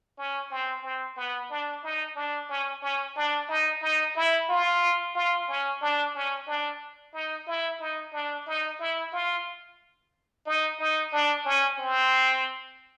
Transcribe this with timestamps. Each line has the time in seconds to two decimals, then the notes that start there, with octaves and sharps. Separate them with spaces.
0.18 C#4
0.51 C4
0.83 C4
1.17 B3
1.50 D4
1.84 D#4
2.16 D4
2.49 C#4
2.82 C#4
3.16 D4
3.49 D#4
3.82 D#4
4.16 E4
4.49 F4
5.15 F4
5.48 C#4
5.82 D4
6.15 C#4
6.47 D4
7.13 D#4
7.47 E4
7.80 D#4
8.13 D4
8.47 D#4
8.79 E4
9.12 F4
10.46 D#4
10.79 D#4
11.12 D4
11.45 C#4
11.78 C4